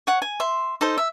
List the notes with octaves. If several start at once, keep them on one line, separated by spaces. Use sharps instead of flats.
C#5 F#5
G#5
E5 C6
D#4 A4 C5
E5